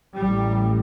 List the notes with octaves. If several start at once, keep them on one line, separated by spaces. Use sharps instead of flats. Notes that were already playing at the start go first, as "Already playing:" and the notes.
A1 A2 G3